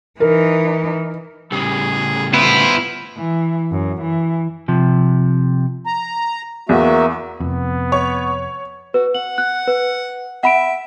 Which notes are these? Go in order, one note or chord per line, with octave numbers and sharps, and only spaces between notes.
E3 D#4 A#4
A2 C#3 G3 G#4
B3 E4 F4 C5
E3
F#2
E3
C3 F3
A#5
E2 A#3 F#4 E5
F1 F2 B3
C#5
F#4 B4
F#5 F#7
F#6
B4
E5 F#5 B5 D7